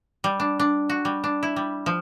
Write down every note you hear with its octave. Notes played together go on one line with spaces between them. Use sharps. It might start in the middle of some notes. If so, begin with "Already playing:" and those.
G3
D4
D4
F#4
G3
D4
E4
G3
F3